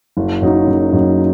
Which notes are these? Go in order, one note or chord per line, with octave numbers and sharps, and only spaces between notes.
F#1
F#2 F#3 D#4
F#1
F#2 F#3 D#4